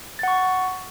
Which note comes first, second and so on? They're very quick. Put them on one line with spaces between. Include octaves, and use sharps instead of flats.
A6 F#5 C#6